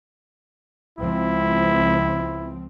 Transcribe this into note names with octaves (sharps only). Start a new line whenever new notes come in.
C#2 F3 C4 E4